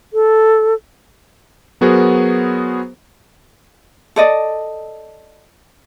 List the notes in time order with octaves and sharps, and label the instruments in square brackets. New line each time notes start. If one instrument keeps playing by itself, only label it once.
[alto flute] A4
[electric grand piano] F#3 B3 F#4 G#4 A#4 C5
[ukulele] A4 D5 D#5